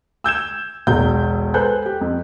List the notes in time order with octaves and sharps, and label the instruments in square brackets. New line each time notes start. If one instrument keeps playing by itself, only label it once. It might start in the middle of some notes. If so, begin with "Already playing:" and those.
[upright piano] E6 G6 G#6 E7
E1 B1 G6
A4 B4 C5 G#5 F#6 G6
G4
F2